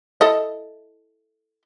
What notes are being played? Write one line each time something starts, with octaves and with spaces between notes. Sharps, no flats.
E4 A4 D#5